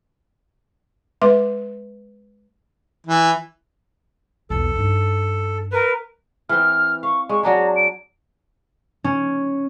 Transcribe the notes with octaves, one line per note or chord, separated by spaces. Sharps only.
G#3 B4 E5 C6 D6
E3
B1 E2 A4
G2 D#4
A#4 B4
E3 C4 F6
F5 C#6
G#3 C#6
F#3 D4 G#4 A#5
D7
C#4